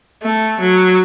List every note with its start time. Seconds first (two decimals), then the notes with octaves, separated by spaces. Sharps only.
0.23 A3
0.61 F#3